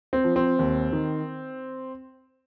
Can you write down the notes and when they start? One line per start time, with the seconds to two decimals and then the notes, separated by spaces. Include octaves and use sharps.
0.13 C4
0.24 F3
0.36 C4
0.59 D#2
0.92 D#3